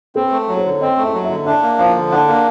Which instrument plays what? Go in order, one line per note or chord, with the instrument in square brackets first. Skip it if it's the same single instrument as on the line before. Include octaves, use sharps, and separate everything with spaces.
[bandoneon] C4 [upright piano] B4
[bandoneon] A3
[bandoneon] F#3 [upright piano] C#5
[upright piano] C5
[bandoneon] D3 [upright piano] C#5
[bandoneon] C4 [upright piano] D#5
[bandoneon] A3
[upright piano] E5
[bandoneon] F#3
[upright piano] E5
[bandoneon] D3
[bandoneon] D4 [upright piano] E5
[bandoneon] A#3
[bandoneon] F3 [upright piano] F5
[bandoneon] D3
[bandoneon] D4 [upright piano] F#5
[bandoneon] A#3